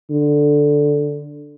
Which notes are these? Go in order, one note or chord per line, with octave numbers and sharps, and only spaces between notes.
D3